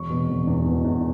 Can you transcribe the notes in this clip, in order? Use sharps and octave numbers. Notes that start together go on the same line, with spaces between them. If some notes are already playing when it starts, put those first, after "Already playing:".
Already playing: E1 C#6
B2
E1
E2
B2
E2